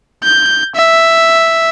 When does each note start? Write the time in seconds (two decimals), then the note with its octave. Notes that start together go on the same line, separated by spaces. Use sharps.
0.23 G6
0.75 E5